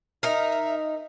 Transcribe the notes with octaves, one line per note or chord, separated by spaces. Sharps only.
D#4 A#4 E5